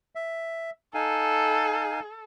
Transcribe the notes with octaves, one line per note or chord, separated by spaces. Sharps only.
E5
D#4 A4 F5 G#5